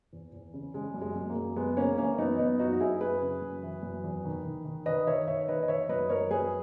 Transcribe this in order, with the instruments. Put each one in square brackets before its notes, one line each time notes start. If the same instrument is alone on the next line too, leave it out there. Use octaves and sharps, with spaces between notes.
[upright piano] E2
E2
C#3
C#3 G#3
F#2
G#3
F#2
A#3
F#2
F#2 G#3 B3
C#3 A#3 C#4
E3 A#3 C#4
F#2 B3 D#4
F#2 B3 D#4
F#2 D#4 F#4
F#4
F#2 E4 G#4
F#2 G#4 B4
C#3
F#2
E3
F#2
E2
D#3
D#3
D#3
D#3 B4 D#5
D#3 C#5 E5
D#3 C#5 E5
D#3 B4 D#5
D#5
D#3 C#5 E5
F#2 B4 D#5
F#2 A#4 C#5
F#2 G#4 B4